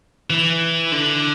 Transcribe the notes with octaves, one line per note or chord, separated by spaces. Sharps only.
E3
D3